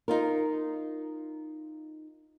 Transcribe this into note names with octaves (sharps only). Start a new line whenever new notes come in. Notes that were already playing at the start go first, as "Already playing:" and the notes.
D#4 F4 A#4